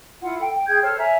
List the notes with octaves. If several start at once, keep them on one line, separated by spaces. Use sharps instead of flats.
E4 F4 F#5
A4 G5
G5
G#4 G5 G6 G#6
A4 C5 C#5 F6
C#5 E5 G#5 A#5